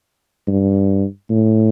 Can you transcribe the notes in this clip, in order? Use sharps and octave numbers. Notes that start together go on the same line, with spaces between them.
G2
A2